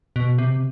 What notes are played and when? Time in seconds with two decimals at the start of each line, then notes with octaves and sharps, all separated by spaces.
0.16 B2
0.38 C3